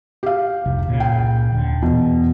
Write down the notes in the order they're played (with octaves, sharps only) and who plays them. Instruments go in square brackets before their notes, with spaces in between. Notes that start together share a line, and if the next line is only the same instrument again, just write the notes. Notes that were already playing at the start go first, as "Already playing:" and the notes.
[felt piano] G4 F5
[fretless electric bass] F1 C2
C#2 A#2 C#3
[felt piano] G5
[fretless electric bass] D#1 D3
[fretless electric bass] E2 [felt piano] B2